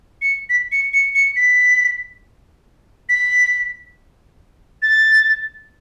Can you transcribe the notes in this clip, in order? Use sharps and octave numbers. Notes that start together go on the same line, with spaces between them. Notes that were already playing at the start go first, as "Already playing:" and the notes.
C#7
B6
C#7
C#7
C#7
B6
B6
A6